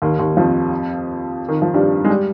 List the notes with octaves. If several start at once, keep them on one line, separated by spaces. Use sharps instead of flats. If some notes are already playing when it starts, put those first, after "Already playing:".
D#2 D#3
D#2 D#3
F2 F3
D#3
F3
G2 G3
G#3
G3